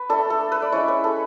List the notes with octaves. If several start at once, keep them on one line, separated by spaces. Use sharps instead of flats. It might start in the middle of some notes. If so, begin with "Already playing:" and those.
Already playing: B4
A3 D4 A4
A4
B4
D5
G#3 C#4 E4 C#5
B4
A4